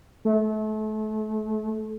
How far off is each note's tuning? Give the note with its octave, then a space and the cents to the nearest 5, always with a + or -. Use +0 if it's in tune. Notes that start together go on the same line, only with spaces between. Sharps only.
A3 -30